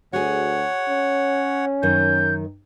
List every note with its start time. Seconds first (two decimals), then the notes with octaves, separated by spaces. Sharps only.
0.13 D2 F#4 G#4 C#5 F#5
0.89 C#4
1.83 F#2 D#3 G6